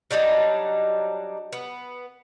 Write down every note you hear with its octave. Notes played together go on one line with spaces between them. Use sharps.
F#3 G3 D4 D#4
B3